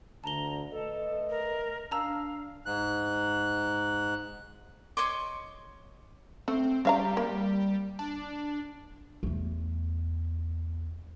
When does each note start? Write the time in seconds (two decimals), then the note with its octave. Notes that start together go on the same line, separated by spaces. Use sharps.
0.24 D2 D3 A5 A#5 G7
0.71 A3 A4 B4 D#5
1.30 A#4
1.91 D4 F5 A5 A#5 E6
2.66 G#2 F#6
4.97 C#5 D#5 C6 D6
6.48 A3 C4
6.85 C#3 G3 F5 A#5
7.17 A#3
7.99 D4
9.23 E2 A3